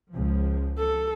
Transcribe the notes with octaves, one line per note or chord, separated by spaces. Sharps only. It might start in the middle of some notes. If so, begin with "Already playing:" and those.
C#2 F3
A4